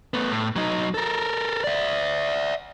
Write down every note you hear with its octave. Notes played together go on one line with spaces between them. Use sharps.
A3 B3
A2
F#3 D#4
A4 A#4
D5 E5